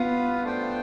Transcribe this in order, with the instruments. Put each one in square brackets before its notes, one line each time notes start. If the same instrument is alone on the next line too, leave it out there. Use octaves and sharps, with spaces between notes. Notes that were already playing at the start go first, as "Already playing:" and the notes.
Already playing: [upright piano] B3 [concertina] F4 B4 F5
[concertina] A3 D4 F4 C5 G5